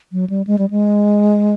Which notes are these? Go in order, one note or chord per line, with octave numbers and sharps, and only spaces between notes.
F#3
G3
G#3
G3
G#3